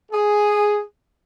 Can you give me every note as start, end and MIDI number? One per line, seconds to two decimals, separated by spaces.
0.12 0.82 68